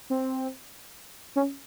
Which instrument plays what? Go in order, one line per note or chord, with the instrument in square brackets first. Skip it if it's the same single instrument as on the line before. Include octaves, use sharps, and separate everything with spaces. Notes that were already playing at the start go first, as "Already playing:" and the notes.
[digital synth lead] C4
C#4